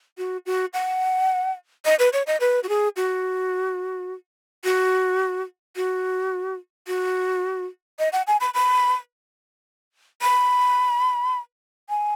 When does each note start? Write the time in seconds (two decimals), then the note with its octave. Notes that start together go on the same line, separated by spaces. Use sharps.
0.18 F#4
0.46 F#4
0.73 F#5
1.85 D#5
1.99 B4
2.13 C#5
2.27 D#5
2.40 B4
2.63 F#4
2.69 G#4
2.96 F#4
4.64 F#4
5.76 F#4
6.87 F#4
7.99 D#5
8.13 F#5
8.27 G#5
8.40 B5
8.54 B5
10.22 B5
11.89 G#5